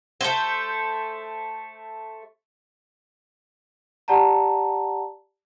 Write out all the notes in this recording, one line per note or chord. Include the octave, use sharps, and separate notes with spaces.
A3 C5
G4 D5 F#5 A5 A#5